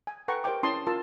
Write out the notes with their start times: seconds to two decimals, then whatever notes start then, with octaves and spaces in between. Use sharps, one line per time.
0.07 G#5
0.28 A4 B4 F#5 G5 A#5 C#6
0.44 G4 A#4 C5 D#5 G5 D6
0.63 C#4 E4 A5 C6 D#6
0.87 F4 A#4 A5 E6